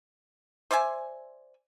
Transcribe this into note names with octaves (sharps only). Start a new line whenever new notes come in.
C5 D5 E5 G#5